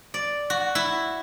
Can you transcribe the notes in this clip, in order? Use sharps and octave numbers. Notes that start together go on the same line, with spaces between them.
D5
F#4
E4